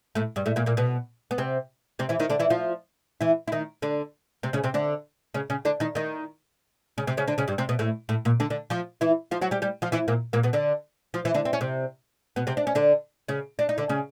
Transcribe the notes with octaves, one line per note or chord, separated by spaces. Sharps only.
A2 A3
G2 G3
A2 A3
A#2 A#3
A#2 A#3
B2 B3
B3
C3 C4
C3 C4
E3 E4
D#3 D#4
D3 D4
E3 E4
F3 F4
E3 E4
E4
D#3 D#4
D3 D4
C3 C4
C#3 C#4
C3 C4
D3 D4
C#3 C#4
C#3 C#4
D3 D4
D#3 D#4
D#3 D#4
C#3 C#4
C3 C4
C#3 C#4
D3 D4
C#3 C#4
G2 G3
C3 C4
B2 B3
A2 A3
A2 A3
A#2 A#3
D3 D4
D3 D4
F3 F4
E3 E4
F3 F4
F#3 F#4
G3 G4
G3 G4
F3 F4
E3 E4
A#2 A#3
A#2 A#3
B2 B3
D3 D4
F3 F4
E3 E4
D3 D4
C4
C#4
C3 C4
B2 B3
C3 C4
D4
C#4
D3 D4
C#3 C#4
D4
D#4
D3 D4
C#3 C#4